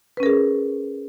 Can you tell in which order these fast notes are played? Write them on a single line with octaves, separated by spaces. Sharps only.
B4 C#4 A#4 G#4